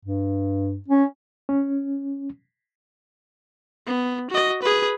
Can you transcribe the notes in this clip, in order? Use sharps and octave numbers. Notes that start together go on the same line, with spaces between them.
G2
C#4
C#4
B3
F#4 D#5
G#4 B4